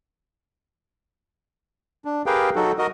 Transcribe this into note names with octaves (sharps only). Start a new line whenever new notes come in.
D4
G4 G#4 A#4 B4 F5 G5
F#3 D#4 F#4 A4
F#4 A#4 D#5